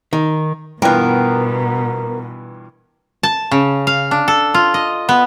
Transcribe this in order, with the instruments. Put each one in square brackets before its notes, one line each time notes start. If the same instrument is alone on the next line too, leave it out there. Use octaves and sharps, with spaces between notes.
[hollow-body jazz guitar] D#3
[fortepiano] G2 E3 F4 [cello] B2 [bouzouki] B3 A#4 [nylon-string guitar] G5
[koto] A5
C#3
F5
D4
A4
F4
D#5
B3